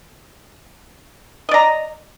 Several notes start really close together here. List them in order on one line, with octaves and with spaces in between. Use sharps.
D#5 D5 A#5